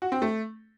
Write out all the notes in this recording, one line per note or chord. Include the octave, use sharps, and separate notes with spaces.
F#4
C4
A3